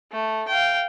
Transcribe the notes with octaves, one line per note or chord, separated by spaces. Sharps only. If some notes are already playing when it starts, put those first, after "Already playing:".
A3
F5 G5